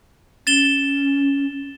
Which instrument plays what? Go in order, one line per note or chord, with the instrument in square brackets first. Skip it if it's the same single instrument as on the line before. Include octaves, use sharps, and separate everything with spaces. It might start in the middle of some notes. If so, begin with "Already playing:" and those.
[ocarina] C#4 [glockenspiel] A6 E7 G7